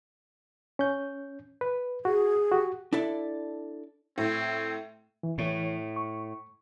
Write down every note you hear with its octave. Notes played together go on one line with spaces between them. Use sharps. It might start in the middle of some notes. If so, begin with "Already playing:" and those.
C#4 G6
B4
F#4 G#4
F#4 G4
D4 E4 A4 D5
A2 C4
E3
A2 E3 C#5
C#6